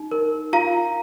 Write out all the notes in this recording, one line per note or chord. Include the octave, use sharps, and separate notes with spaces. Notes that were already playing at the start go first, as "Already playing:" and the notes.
Already playing: D#4
A#4
F4 F5 A#5